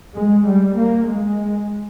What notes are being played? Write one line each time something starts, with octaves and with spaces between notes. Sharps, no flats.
G#3
G3
A#3
G#3